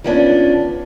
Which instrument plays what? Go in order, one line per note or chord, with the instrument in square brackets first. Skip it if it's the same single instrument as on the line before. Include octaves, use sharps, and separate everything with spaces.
[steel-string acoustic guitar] D#3 F3 G3 B3 C#4 D4